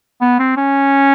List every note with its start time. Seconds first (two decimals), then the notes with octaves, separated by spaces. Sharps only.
0.21 B3
0.39 C4
0.57 C#4